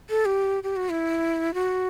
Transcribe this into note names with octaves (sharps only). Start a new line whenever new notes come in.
A4
G4
G4
F#4
E4
F#4